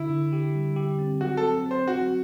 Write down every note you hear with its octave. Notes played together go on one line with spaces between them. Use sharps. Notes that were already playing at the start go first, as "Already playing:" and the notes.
Already playing: D3 E4
D3
G4
G3
G4
C4
F#3 F#4
A4
C4
C4
C5
F#3 F#4